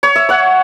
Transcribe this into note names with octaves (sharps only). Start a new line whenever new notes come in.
C#5
E5
C#5 F#5